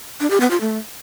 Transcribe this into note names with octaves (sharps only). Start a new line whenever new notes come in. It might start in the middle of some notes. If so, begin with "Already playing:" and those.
D4
G4
B3
F4
A3